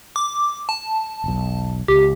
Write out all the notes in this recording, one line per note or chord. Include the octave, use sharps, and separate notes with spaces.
D6
A5
E1 B1
C#2 G4